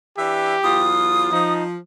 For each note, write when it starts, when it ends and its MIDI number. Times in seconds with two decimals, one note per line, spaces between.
0.18 0.55 52
0.18 0.55 62
0.18 0.90 67
0.18 0.55 76
0.64 1.30 40
0.64 1.30 54
0.64 1.30 65
0.64 1.53 87
1.32 1.76 53
1.32 1.64 63